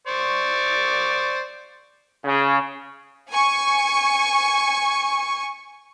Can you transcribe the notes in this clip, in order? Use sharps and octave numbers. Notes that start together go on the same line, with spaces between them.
C5 D5 C#6
C#3
G#5 C#6